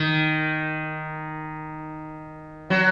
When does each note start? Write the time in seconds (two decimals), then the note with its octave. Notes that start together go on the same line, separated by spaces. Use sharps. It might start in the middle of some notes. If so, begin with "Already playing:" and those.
Already playing: D#3
2.70 F#3